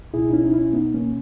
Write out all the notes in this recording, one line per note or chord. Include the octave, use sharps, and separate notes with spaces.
C#2 B2 E4 G#4
D#4
C#4 E4
D#4
C#4 E4
B3 D#4
A#3 C#4